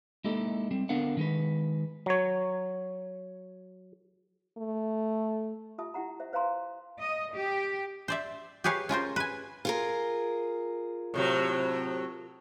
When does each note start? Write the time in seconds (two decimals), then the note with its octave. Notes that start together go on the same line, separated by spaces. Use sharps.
0.24 G#3 A#3 D#4 E4 G4 A4
0.71 G3 C4
0.89 D3 B3 D4 A#4 F5 F#5
1.17 D#3 G#3 B4
2.06 F#3 C#5
4.58 A3
5.78 F4 G4 E5 A5 D#6
5.94 E4 G4 F#5 A#5
6.20 C5 E5
6.33 B4 C5 F5 G#5 A#5 C6
7.01 D#5
7.35 G4
8.08 C5 D5 E5
8.64 G4 G#4 B4 C#5 F5
8.89 C#4 F4 A#4 C5
9.16 B4 G#5
9.65 F4 G#4 A#4
11.14 A2 C3 F#3